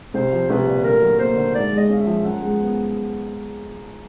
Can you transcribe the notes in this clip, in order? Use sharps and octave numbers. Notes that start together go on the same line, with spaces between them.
C2 C5
F3
C2 B4
A#2
D2 A#4
F#3
A#3 C5
D3
G#2 D5
G#3
D#5
C#4 F5
E5
F3
F#2 F#5
G#3
B3